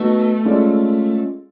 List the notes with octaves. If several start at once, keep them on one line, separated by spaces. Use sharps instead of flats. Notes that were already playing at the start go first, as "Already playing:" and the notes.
Already playing: A3 B3 D#4 F#4
G#3 C#4 F4 A4 D5